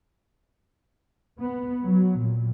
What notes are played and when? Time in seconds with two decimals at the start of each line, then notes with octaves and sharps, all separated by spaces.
1.40 B3
1.85 F#3
2.20 A#2